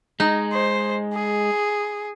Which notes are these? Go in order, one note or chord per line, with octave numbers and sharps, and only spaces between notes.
G#3 D#4
C5
G#4